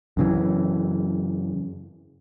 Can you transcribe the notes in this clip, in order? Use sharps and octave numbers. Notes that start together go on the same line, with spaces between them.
F#2 C#3 E3